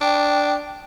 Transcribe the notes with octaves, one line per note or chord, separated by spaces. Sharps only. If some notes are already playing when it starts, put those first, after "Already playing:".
D4 G5